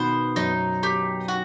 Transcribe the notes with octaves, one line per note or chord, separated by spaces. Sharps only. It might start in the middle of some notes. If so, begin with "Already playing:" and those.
Already playing: B2 D#3 B3 C5
F#2 D#4
G4
F#4